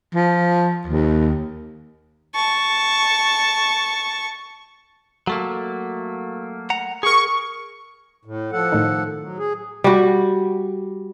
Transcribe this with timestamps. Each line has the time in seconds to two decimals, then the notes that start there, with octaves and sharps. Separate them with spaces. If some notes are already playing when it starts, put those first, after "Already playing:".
0.14 F3
0.87 D#2
2.35 A5 C#6
5.27 F#3 A3 A#3
6.70 F#5 A#5
7.03 G#4 A#4 C#6
8.25 A2
8.52 F3 A4 F#5
8.72 A2 D#3
9.20 F#3
9.38 G#4
9.84 G3 F#4